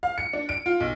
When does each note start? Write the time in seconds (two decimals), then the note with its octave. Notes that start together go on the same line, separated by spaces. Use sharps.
0.03 F5
0.18 C#7
0.33 D4
0.49 D7
0.66 F4
0.80 B1